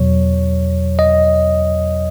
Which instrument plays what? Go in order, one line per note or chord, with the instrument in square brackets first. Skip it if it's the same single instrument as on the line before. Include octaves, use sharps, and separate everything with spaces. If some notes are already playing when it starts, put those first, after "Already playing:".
Already playing: [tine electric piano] E2 B2 F#3 C#5
D#5